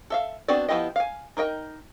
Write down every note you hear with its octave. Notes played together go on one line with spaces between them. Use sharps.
A4 E5 F5
B3 C4 D4 F#4 D5
F3 B3 E4 G4 D#5
F5 G#5
D#4 A#4 D#5 G5